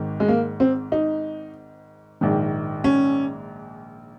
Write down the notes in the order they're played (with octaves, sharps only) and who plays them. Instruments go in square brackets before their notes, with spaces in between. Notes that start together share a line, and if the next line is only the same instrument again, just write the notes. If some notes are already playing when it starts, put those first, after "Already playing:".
Already playing: [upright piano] G#1 G#2 D#3
G#3
A#3
C4
D#4
A#1 G#2 D#3
C#4